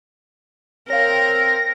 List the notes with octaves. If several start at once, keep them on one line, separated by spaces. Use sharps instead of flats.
C4 A#4 C#5 F5 G5 A#6